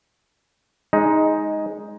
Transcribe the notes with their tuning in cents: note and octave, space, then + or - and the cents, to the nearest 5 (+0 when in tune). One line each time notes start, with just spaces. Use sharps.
G#3 +0 D#4 +10